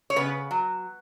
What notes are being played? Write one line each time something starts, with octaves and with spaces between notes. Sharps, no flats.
C#5
C#3 B3 B4
F#3